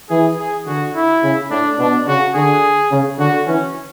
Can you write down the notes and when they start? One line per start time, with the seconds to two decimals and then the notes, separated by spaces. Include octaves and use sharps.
0.10 E3 G#4
0.38 G#4
0.66 D3 F#4
0.95 E4
1.23 C#3
1.50 A2 D4
1.78 B2 D4
2.07 C#3 F#4
2.35 D3 G#4
2.91 C#3
3.19 D3 F#4
3.46 E3 C#4